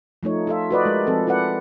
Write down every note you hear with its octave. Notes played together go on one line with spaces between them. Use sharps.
F3 A3 D#4 C#5
F4 A4 E5
F#4 B4 D5 D#5
G#3 A#4
F3 C4 A4
E4 A4 B4 D5 F#5